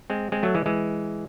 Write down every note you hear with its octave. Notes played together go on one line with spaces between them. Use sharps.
G#3 C4
G#3 C4
F#3 A3
E3 G#3
E3 G#3